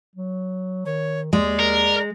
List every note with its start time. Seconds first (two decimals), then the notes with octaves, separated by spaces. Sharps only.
0.16 F#3
0.86 D#3 C#5
1.33 D#2 G#3 D5
1.59 A#4